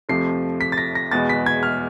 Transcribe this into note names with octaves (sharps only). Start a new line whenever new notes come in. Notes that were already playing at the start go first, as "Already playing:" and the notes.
F2 C3 F3 A3 C7
B6
A6
A#6
A#6
E2 B2 G#3 B3 A6
B6
G#6
F6